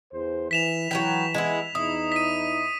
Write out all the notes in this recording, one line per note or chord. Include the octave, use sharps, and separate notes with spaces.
E2 C5
E3 B6 E7 F7
E3 F#3 B4 G5 B6
G#3 B3 E4
E2 D#4 E4 D#6
B6 D#7